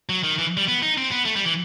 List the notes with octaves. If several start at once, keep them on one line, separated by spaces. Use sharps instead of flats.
F#3
D#3
E3
G3
B3
D#4
C4
B3
A3
G3
E3